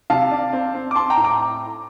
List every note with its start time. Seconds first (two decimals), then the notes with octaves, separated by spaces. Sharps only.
0.10 C3 F5 A5
0.31 D4
0.53 C4
0.75 C4
0.91 D6
0.96 C4 A5 C6
1.10 G5 A#5
1.17 A2
1.24 A#5 D6